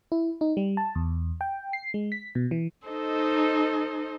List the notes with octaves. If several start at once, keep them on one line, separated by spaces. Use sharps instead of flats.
E4
D#4
G3
A5
E2
G5
C7
G#3
B6
B2
E3
D#4 A4 C5 D#5